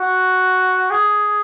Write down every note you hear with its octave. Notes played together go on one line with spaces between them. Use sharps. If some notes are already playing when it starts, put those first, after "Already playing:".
Already playing: F#4
G#4